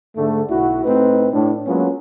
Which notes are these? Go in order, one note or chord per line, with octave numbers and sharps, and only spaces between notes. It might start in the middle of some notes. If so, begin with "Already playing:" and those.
G#2 D3 A3
B1 E4 F#4
A2 A3 C4 D#4 B4
A2 D4
F#3 G#3 A#3 B3 C#4 F4